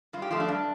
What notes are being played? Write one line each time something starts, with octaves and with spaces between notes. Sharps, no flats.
G2 F4
G4
F3 A3 F4
D4
G2